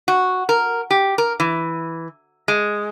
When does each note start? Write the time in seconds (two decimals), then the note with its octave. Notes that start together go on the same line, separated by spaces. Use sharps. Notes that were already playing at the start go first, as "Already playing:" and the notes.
0.08 F#4
0.49 A#4
0.91 G4
1.18 A#4
1.40 E3
2.48 G#3